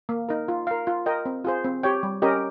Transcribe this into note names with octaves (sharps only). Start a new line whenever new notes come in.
A#3
D#4 A#4
F4
A#4 F5
F4
A#4 D#5 G5
C4
F4 G#4 C5
C4
G4 C#5 G5
G3
C#4 G4 A#4 D#5